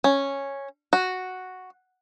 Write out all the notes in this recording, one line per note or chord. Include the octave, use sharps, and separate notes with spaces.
C#4
F#4